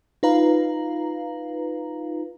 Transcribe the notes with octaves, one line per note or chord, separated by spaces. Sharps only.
D#4 F4 B4 F5 A#5